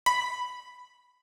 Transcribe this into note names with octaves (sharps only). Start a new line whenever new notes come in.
B5